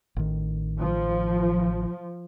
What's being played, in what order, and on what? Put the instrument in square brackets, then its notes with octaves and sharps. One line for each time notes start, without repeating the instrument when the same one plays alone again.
[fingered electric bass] A1 D#3
[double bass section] F3